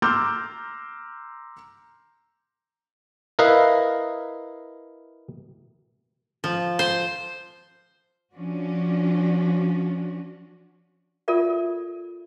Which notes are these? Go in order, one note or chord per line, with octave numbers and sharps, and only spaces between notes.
A#5 C6 D6 E6 F6 G6
E4 A#4 B4 D#5 F5
F3
C5
F3 C#4 D4 F#4
F4 A4 A#4 D5 E5